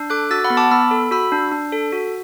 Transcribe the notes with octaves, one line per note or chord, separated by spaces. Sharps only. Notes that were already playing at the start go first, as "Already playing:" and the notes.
Already playing: D4
A4 D6 F#6
F#4 E6 A6
F#5 B5
B3
A5 D6
B3 B5 E6
A4
F#4 B5 E6
D4
D4
A4
F#4